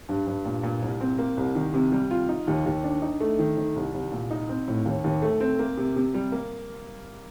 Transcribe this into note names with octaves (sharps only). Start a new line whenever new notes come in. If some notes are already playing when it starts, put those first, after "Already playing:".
G2
G2
A#2
A#2
C2
C4
A#3
C2
D#3
C3
G3
F4
D#4
D#2
D#2
D4
D#4
A3
D#3
D#3
C2
C2
A#2
D#4
C4
A2
D#2
D#2
A3
C4
A#3
C3
C3
G3
A#3